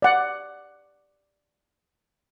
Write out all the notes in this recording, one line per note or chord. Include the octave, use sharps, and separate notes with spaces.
D5 F#5